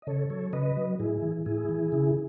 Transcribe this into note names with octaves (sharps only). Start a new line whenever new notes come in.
D#5
C#3 A4 C#5
F#3 A4 C#5
C#3 B4 D#5
F#3
A2 E4 G#4
E3
A2 E4 G#4
E3
C#3